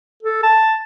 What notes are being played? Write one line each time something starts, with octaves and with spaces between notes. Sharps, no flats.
A4
A5